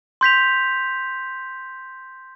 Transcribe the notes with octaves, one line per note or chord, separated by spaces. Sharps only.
C6 G6 B6 F7